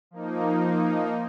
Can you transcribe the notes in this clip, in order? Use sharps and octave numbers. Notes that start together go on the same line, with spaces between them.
F3 A#3 D#4